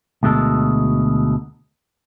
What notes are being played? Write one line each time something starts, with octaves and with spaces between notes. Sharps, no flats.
D2 B2 G#3 A4 A#4